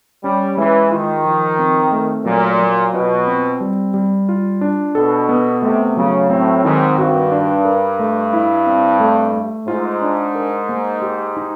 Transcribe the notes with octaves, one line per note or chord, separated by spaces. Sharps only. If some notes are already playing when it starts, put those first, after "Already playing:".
G3 C#4
E3 G#3
D#3 F4
F3
C4
A3
A#2 F#3
F#3
B2 F4
C4
G3
G3
F4
D4
B2 A4
B3
C3 A3
C#3 F#3
A2 C4
G#2 D#3
G2 F#4
D4
A#4
A3
E4
C4
A3
A3
G#2 F4
D4
A#4
A#3
G4
D#4